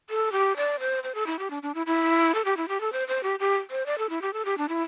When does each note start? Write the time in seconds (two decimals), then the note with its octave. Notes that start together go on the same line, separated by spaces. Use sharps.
0.10 A4
0.32 G4
0.56 D5
0.79 C5
1.03 C5
1.15 A4
1.26 E4
1.39 G4
1.50 D4
1.63 D4
1.74 E4
1.86 E4
2.35 A4
2.45 G4
2.57 E4
2.68 G4
2.81 A4
2.92 C5
3.08 C5
3.23 G4
3.39 G4
3.71 C5
3.86 D5
3.98 A4
4.09 E4
4.22 G4
4.33 A4
4.45 G4
4.58 D4
4.69 E4